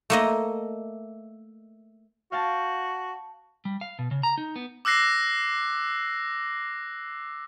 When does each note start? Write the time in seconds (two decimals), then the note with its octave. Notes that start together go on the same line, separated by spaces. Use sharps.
0.10 A3 A#3 D#5
2.32 F#4 F5 G5 A5
3.65 G3
3.81 F5
3.99 B2
4.11 C#3
4.23 A#5
4.38 D#4
4.56 B3
4.85 D6 E6 F#6 A#6 C7